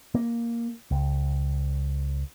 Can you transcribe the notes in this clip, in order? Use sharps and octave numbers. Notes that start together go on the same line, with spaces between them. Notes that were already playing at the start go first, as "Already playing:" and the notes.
A#3
C#2